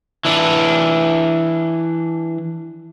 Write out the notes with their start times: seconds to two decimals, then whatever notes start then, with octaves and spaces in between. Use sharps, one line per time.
0.25 E3 D4